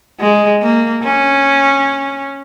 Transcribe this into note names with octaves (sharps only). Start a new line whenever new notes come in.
G#3
A#3
C#4